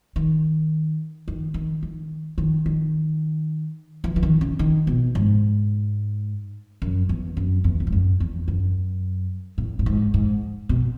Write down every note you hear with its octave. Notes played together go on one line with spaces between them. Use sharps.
D#3
D#3
D#3
D#3
D#3
D#3
E3
E3
D#3
C#3
D#3
B2
G#2
F#2
E2
F#2
E2
E2
G#2
F#2
E2
F#2
A2
A2
G#2
G#2
B2